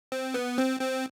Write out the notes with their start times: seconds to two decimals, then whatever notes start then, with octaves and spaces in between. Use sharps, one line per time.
0.12 C4
0.34 B3
0.58 C4
0.81 C4